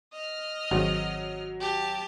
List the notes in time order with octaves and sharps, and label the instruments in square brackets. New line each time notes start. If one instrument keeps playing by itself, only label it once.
[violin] D#5 F6
[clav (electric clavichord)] G#1 [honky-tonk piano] F#3
[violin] G4 A5